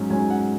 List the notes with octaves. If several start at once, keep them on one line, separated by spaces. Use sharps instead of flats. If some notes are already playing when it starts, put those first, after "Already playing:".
Already playing: G#2 F#3 C#4
G#2 F#3 C#4 G#5
F#5